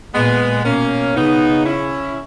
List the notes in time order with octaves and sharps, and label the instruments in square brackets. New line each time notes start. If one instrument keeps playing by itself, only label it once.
[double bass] A#2 [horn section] G#3 B3
[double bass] B2 [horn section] A#3 C#4
[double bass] C#3 [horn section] B3 D#4
[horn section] C#4 E4